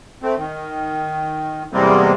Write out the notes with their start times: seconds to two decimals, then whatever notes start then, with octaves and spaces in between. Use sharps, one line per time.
0.22 A3 C4
0.37 D#3
1.72 E2 C3 G3 G#3 A#3 C4